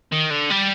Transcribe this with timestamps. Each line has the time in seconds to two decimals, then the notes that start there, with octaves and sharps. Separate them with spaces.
0.12 D#3
0.31 D3
0.51 G3